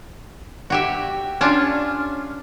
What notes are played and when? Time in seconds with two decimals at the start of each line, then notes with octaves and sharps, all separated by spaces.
0.70 F#4 G4 E5
1.41 C#4 D4 F4